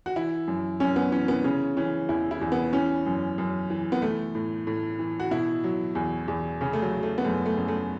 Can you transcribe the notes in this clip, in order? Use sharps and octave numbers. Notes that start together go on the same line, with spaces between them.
F#4
E3 E4
F#2
F#2 C#4
B3
E3 C#4
B3
C#3 C#4
E3 C#4
E2 E4
E4
E2
B3
E3 C#4
F#2
F#2
E3
B3
E3 A3
A2
A2
E3
F#4
B2 E4
F#3
E2
E2
C#3 C#4
A3
F#3
F#3
A3
B3
F#2 A3
A3
F#2
A3